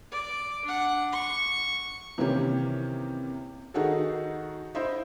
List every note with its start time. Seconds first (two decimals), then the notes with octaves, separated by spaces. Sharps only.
0.12 D5
0.65 D4 F#5
1.12 C#6
2.18 C3 D#3 E3 A#3 C#4 G4
3.74 D#3 D#4 F#4 G#4 A4
4.75 E4 C5 D#5 E5